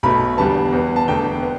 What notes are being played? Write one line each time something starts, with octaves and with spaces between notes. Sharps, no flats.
B1 B2 A3 B5
E1 E2 D3 G3 B3 A5
E2 E3 B3
A5
E1 E2 D3 A3 G5
B3